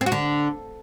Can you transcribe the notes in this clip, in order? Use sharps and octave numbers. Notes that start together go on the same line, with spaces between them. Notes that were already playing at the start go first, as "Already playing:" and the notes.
C4
F#4
D3